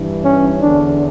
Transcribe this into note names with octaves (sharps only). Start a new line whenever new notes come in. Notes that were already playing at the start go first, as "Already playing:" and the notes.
Already playing: G2 E3
C#4
E2 D3 D4